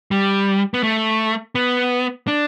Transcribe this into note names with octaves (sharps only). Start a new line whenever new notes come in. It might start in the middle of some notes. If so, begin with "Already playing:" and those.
G3
B3
A3
B3
D4